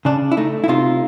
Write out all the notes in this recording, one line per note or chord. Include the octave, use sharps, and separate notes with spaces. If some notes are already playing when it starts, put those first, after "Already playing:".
C#3 D4
E4
A3 D#4
E4
C3 D#4 F4